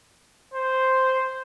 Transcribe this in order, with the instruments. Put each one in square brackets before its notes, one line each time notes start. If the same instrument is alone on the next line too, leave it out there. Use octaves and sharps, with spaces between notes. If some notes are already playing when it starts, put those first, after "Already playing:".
[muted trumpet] C5